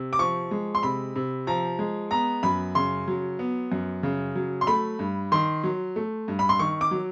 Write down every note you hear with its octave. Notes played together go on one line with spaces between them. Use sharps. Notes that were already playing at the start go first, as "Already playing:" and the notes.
Already playing: C3
D6
F3 C#6
G#3
C6
C3 B5
C3
F3 A#5
G#3
B3 A#5
F#2 B5
C#3 C6
F#3
B3
F#2
C#3
F#3
C6
A3 B5
G2
D#3 C6
F#3
A3
G2
B5
C6
D#3 C#6
D6
F#3